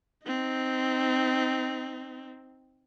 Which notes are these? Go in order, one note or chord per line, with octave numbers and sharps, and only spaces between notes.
C4 D#4